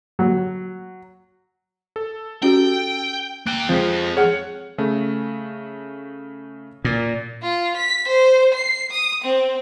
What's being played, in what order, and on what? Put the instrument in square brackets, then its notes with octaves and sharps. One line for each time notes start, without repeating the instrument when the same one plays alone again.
[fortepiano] F#3
[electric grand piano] A4
[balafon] C#4 F#4 G4 [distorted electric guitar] G5
[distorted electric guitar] A#3 G5 [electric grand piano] F#6 D7
[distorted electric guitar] F2 [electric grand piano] F3 G#3 [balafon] C4
[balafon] G#4 [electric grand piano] C#5 F#5 F6
[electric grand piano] C#3 A3
[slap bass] A#2
[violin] F4
B6
C5
C7
D#6
C4